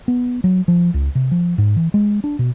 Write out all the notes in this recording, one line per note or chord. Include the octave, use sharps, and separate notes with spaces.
B3
F#3
F3
C#2
C3
F3
G#2
E3
G#3
D4
B2